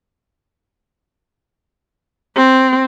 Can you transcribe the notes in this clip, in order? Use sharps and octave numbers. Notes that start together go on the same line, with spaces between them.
C4